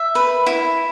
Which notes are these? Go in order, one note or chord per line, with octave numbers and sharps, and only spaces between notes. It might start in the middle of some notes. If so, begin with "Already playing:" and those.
Already playing: E5
B4
E4